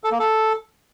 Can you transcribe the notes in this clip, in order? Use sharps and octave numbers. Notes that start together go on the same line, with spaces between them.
A4
A#3
A4